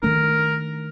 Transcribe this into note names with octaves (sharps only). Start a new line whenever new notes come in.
D#3 A3 D4 A#4